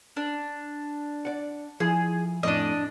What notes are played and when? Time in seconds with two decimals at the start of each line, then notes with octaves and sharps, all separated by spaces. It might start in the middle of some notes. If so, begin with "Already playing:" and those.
0.17 D4
1.25 D5 F#5
1.80 F3 E4 G#4
2.43 F2 A2 D4 D5 D#5